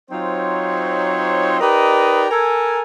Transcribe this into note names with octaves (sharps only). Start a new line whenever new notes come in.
F#3 C4 D#4 F4 C5 C#5
D#4 G4 A#4 B4 D5 D#5
A4 A#4 G#5